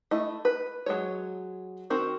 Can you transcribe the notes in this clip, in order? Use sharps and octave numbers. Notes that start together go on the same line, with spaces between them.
A3 E4 D#5
B4
F#3 G#3 C#5
D#3 C4 F#4 A#4